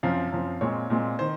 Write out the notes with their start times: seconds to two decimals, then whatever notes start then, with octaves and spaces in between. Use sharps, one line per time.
0.03 F#2 F3 C4 F5
0.32 F#2 F3 C4
0.61 A#2 G#3 C4 C#5
0.90 A#2 G#3 C4
1.19 D#3 C5